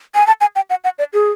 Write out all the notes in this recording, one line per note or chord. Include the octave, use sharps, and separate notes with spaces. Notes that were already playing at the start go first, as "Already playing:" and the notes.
G#5
A5
G#5
G5
F#5
F#5
D5
G#4